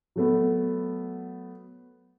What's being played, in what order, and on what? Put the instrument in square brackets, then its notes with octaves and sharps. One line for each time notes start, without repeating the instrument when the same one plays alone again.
[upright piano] F#3 A3 B3